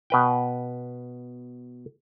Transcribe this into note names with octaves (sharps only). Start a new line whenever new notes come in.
B2 B4 G5